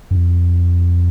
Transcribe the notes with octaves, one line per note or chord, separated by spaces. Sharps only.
F#2
F2